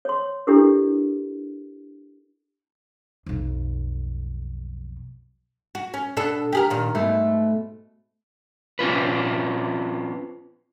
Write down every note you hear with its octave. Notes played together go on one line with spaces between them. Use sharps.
C#5 C6
D4 E4 G4 A4 A#4
B1 F2
F#4
C#4
B2 D4 A4
G4 G#4 A#4
A#2 D#3
G#2 B2 A3
C4 C#4 F4 B4